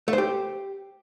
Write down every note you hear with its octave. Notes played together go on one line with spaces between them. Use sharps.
A3
C5
G4